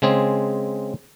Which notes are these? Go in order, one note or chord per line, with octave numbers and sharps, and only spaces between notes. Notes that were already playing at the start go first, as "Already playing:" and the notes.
C#3 G#3 C4 G#4